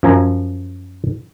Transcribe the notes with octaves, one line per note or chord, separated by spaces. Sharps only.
F#2 F3 G#5 A#5